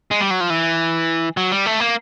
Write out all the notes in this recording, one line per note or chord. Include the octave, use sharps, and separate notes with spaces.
G#3
G3
F#3
F3
E3
F#3
G3
A3
A#3